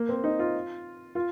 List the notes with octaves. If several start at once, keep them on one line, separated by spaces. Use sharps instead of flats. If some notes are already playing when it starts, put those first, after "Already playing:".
Already playing: A#3
C4
D#4
F4
F4